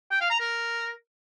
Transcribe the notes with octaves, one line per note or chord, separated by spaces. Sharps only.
G5
F5
A#5
A#4